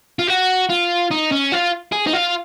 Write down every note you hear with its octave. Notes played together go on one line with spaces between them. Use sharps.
F4
F#4
F4
D#4
C#4
F4
G#4
D#4
F4